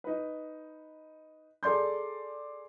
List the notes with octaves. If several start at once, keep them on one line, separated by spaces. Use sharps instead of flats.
D#4 B4
G#4 A4 D5 C6 G6